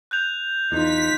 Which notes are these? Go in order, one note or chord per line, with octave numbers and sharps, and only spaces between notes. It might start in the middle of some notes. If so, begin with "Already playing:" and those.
F#6 G6 F7
E2 D#4 F4 B6